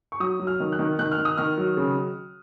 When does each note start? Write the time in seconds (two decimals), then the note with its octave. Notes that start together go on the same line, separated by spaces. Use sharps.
0.12 C#6
0.20 F#3 D#6
0.40 F#3
0.47 F6
0.60 D#3
0.72 F#6
0.79 D#3
0.99 D#3 F#6
1.11 F6
1.18 D#3
1.25 D#6
1.37 D#3 F6
1.58 F#3
1.77 C#3